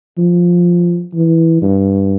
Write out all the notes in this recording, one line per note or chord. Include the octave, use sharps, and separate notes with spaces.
F3
E3
G2